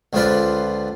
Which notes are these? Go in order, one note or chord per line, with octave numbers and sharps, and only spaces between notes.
C#2 D3 F3 F4 B4 D5